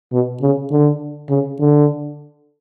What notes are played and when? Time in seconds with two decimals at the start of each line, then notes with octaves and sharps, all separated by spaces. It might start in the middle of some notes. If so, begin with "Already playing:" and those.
0.12 B2
0.41 C#3
0.71 D3
1.30 C#3
1.59 D3